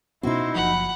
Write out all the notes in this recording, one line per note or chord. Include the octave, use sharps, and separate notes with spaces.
B2 B3 C#4 D#4 E4 F#4 C5
F#1 F3 F#5 B5